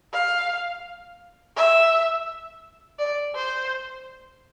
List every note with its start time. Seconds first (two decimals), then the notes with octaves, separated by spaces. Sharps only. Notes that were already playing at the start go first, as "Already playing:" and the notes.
0.13 F5
1.57 E5
2.99 D5
3.35 C5